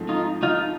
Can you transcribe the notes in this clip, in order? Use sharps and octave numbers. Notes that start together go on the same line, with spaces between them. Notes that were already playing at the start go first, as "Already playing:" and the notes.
Already playing: G#2 F3 A3 C4
D#4 F4
D#4 F4